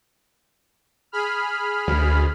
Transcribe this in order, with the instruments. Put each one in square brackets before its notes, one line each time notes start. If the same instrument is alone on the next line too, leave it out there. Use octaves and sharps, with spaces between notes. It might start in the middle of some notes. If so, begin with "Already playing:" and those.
[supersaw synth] G#4 B5 F6
[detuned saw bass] D2